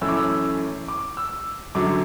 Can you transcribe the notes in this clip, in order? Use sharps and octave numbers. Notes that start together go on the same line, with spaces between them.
F#2 E3 A3 C#4 E6
D6
E6
D6
E6
F#2 D3 F#3 D6